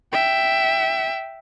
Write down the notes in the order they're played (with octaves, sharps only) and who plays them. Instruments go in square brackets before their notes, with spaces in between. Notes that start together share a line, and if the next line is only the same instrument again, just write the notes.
[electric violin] E5 G5